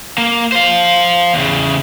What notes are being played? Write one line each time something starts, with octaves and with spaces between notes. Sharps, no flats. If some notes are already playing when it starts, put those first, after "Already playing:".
A#3
C5 F5
E2 C#3